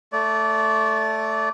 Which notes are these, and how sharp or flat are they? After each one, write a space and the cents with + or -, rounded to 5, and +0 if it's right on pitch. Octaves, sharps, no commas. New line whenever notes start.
A3 +0 D5 -25